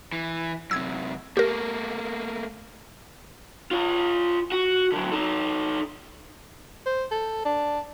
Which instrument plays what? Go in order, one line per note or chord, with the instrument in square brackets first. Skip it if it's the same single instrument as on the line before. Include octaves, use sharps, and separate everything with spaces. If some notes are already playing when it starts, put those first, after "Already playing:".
[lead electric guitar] E3
[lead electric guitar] F#2 C3 [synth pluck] E6 G#6
[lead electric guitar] A3 A#3 [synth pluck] G4 A#4
[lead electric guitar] F4 C#5
F#4
D3 F#3
D#4 A4
[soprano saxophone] C5
A4
D4